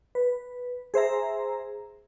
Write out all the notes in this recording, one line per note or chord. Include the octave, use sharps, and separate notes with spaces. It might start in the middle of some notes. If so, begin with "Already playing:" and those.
B4
G#4 C5 E5 A#5